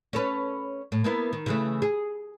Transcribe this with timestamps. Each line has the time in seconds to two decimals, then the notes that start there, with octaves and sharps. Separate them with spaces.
0.13 C#4 A4 B4
0.92 A2
1.04 A#3 B3 E4
1.33 D#3
1.46 C#3 E3 A3
1.82 G#4